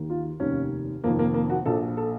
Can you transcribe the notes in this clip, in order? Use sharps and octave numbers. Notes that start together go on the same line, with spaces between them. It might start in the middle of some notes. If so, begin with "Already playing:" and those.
Already playing: D#2 D#3
F4
F1 D#2 D#3 C#4
F1 F2 D#3 A#3
A#3
A#3
F#4
A#1 A#2 F3 A4
A4